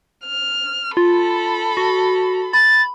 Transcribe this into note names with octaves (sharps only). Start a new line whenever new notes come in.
F6
F4 A4 B5
F#4
B5 A6